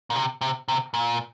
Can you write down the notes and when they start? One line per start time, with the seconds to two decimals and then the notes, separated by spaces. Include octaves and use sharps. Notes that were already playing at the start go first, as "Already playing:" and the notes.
0.10 A#2
0.16 C3
0.41 C3
0.68 C3
0.94 A#2